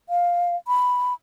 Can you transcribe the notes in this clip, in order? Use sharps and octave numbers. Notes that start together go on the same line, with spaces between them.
F5
B5